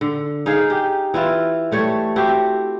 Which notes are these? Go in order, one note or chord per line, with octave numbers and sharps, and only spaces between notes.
D3
D#4 G#4 F5
G4
E3 E4 F4
G3 A3 C#5
C4 E4 F#4 G4